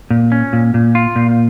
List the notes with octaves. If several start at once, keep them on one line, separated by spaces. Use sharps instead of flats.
A#2
C#4
A#2
A#2
F4
A#2